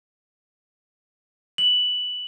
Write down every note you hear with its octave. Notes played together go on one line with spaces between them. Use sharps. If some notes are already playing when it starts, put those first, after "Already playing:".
F#7